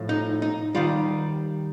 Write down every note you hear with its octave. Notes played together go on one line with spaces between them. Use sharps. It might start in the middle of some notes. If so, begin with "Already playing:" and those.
Already playing: A2 F3
D#4
D#4
D#3 G3 F4